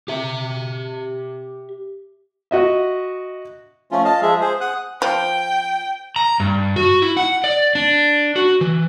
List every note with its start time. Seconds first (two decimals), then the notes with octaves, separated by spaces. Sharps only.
0.08 G4 E5
2.51 F#4 D#5 E5
3.91 F3 A3 C#4 F4
4.05 D#5 F5 A5
4.22 F3 G#3 G#4 E5
4.41 G#4 C5
4.61 F#5 D#6 F#6
5.02 F3 G5
6.16 A#5
6.40 G2
6.76 F#4
7.02 E4
7.17 F#5
7.44 D5
7.75 D4
8.36 F#4
8.61 E3